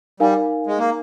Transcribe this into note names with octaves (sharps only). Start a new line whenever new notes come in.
G3 D#4 A#4 F5 G#5
G#3
A#3